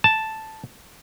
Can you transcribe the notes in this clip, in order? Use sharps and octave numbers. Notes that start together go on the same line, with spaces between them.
A5